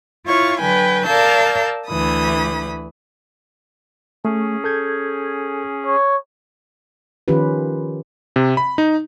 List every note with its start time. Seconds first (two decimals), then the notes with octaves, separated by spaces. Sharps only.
0.26 E4 F4 C#5 F5 C#6
0.60 D3 F#3 B4 G5 G#5
1.05 A#4 D5 F5 A5 E6 G6
1.88 D2 E3 B5 D#6
4.25 A3 C#4 G#4
4.64 A4 G6 G#6
5.86 C#5
7.28 D#3 F3 C#4 F4 G4 B4
8.36 C3
8.57 B5
8.78 D#4